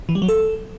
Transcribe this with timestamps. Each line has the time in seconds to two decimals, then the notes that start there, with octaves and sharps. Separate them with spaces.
0.09 E3
0.15 G3
0.22 F#3
0.28 A4